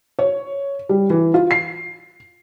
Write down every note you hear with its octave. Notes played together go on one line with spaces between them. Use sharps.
C#5
G3
E3
F4
C7